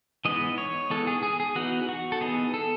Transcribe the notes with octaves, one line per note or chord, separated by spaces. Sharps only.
E3 G#3 B3 D#4 D#5
C#5
E3 G#3 B3 D#4 A4
G#4
G#4
G#4
E3 B3 D#4 F#4
F#4
A4
E3 B3 D#4 G#4
A4